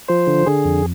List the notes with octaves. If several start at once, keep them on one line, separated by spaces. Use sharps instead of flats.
F3 C5
D3
D3 G#4
F2